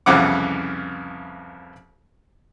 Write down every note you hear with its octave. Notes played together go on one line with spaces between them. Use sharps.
C2 F2 C#3 E3 F#5 D6